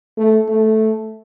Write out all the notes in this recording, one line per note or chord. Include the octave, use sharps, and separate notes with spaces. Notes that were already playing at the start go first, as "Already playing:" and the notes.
A3
A3